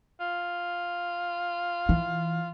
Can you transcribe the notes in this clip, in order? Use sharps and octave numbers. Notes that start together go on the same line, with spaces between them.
F4
E3